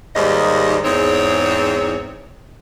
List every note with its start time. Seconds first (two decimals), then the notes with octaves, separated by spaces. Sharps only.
0.15 D#2 G#2 G3 D#5
0.84 E2 G#2 C4 C#5